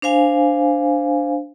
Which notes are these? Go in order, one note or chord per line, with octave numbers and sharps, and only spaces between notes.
D4 C5 F5 G#5